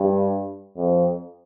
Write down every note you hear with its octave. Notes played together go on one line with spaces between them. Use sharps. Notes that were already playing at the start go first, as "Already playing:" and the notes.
Already playing: G2
F2